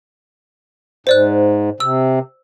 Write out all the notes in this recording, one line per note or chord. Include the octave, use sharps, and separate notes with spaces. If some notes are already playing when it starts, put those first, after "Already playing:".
G#2 C5 D5 F#6
C3 E6